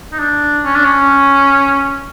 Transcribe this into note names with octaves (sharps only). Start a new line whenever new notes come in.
D#4
D4
C#4
D4
C#4